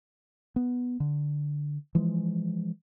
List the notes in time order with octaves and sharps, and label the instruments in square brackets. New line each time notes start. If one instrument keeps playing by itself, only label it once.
[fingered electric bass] B3
D3
E3 F3 G#3